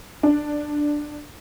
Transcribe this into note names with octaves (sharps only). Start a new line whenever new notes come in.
D4